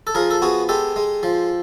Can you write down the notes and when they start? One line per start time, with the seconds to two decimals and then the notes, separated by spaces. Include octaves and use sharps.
0.07 A4
0.15 F3 G#4 A#4
0.31 A4
0.42 B3 F#4 G#4
0.69 G#3 G4 A4
0.96 G#3
1.23 F3